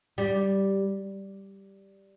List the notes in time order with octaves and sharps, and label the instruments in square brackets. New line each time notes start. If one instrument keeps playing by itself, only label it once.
[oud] G3